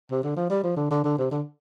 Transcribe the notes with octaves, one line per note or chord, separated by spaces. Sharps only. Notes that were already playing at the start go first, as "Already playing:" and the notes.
C3
D3
F3
G3
F3
D3
D3
D3
C3
D3